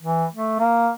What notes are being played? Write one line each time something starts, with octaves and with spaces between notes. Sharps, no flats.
E3
A3
A#3